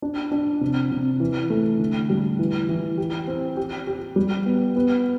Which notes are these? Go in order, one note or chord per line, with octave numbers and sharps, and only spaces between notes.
D4
D4
C3
C3
E3
A3
D3
G3
E3
E3
G4
C4
G4
G4
G3
B3
B3